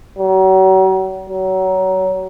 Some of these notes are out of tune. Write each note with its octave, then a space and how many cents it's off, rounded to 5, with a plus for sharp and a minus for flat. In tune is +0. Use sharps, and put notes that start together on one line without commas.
F#3 +40
F#3 +25